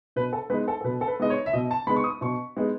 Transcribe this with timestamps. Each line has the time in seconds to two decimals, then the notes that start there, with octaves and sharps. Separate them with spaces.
0.16 B2 B4
0.33 A4
0.50 G#3 B3 D#4 B4
0.68 A4
0.81 A4
0.84 B2 B4
1.01 A4
1.08 B4
1.20 G#3 B3 D#4 D#5
1.30 C#5
1.46 E5
1.53 B2 D#5
1.71 A5
1.87 G#3 B3 D#4 B5
1.96 C#6
2.04 D#6
2.21 B2 C#6
2.57 G#3 B3 D#4